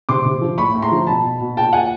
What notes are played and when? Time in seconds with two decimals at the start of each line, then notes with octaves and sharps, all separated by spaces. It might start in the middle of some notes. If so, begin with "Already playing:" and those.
0.09 C3 C6 D6
0.25 C3
0.41 F3
0.58 A2 B5 C#6
0.74 A2
0.82 A#5 C6
0.92 F3
1.07 B2 A5 B5
1.24 B2
1.41 B2
1.57 A#2 G5 A5
1.73 A#2 F#5 G#5